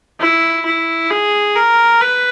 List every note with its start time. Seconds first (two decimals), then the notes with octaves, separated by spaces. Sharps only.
0.20 E4
0.65 E4
1.11 G#4
1.55 A#4
2.01 B4